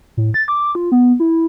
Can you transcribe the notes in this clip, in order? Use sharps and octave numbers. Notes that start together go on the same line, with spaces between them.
A2
A6
D6
F4
B3
E4